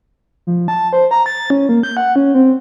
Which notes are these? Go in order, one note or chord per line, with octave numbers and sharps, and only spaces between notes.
F3
A5
C5
A#5
A6
C#4
A#3
G6
F#5
C#4
C4